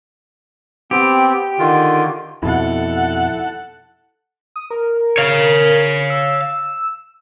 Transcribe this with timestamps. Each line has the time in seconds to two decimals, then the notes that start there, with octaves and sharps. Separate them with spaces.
0.91 B3 C4 G4
1.59 D3 D#3 F4
2.43 F2 B2 E4 A4 F#5
4.56 D#6
4.71 A#4
5.18 C#5 F5
6.10 E6